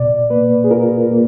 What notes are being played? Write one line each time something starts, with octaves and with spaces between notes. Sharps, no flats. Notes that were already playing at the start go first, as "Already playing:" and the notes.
Already playing: B2 D5
A#3 B4
G#4
F4 A#4
A#3